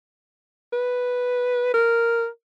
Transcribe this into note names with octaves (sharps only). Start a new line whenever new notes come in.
B4
A#4